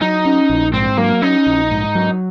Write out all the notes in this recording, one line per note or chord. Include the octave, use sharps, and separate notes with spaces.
F#3 D#4
C#4
A#1
G#2 C4
F#3 A#3
C#4 D#4
A#1
G#2
F#3